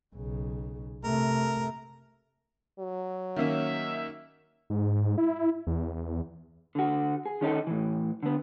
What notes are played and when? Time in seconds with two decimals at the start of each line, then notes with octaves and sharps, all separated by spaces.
0.16 B1 C#3
1.04 C3 A3 A#4
2.79 F#3
3.36 D#3 A#3 C#4 E5
4.70 G#2
5.18 E4
5.67 E2
6.75 D3 F#4
7.26 G#4
7.41 D#3 C#4 D#4 A4
7.67 A2 E3
8.23 D3 B3